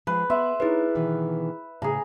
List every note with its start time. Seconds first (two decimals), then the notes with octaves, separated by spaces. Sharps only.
0.07 F3 G#3 B4
0.30 B3 E5 C6
0.60 D#4 E4 G#4 A#4 B4 C#5
0.95 B2 D#3 E3
1.82 A2 C#3 G#4 A#5